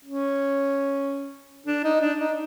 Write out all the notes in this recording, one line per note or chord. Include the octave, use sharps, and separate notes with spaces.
C#4
D4
D#4
D4
D#4